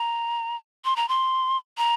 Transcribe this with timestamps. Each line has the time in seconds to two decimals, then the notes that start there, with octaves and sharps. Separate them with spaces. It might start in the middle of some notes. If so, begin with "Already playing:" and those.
Already playing: A#5
0.85 C6
0.96 A#5
1.09 C6
1.78 A#5